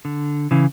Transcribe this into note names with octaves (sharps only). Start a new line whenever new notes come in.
D3
C#3 E3